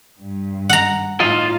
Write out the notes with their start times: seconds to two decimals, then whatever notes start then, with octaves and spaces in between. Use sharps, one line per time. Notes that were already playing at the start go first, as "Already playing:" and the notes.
0.21 G2
0.69 F#5 A#5
1.20 A2 D#4 F4 D#5 F5